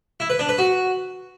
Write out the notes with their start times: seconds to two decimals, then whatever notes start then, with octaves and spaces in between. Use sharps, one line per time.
0.20 E4
0.30 B4
0.39 D4
0.49 B4
0.58 F#4